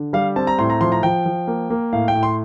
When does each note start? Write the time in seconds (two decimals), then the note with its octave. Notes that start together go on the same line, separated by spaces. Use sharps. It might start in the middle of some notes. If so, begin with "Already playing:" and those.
Already playing: D3
0.13 G3 F5
0.36 C4 A5
0.47 A#5
0.58 A2 C6
0.70 A#5
0.81 F3 C6
0.92 A#5
1.03 F3 G5
1.26 F3
1.48 A#3
1.70 A#3
1.93 A2 F5
2.08 G5
2.15 A2
2.23 C6